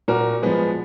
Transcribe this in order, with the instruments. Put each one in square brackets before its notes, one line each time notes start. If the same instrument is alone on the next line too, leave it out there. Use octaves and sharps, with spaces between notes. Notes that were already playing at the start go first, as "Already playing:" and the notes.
[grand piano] A#2 F#4 A#4
F3 G#3 B3